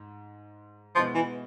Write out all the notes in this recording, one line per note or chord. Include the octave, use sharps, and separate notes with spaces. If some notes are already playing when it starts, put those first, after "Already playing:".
Already playing: G#2
B2 F3 G#3 B3 E4
E3